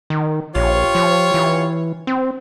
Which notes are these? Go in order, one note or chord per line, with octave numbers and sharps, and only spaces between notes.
D#3
A#1 F4 G4 C#5
F3
E3
C4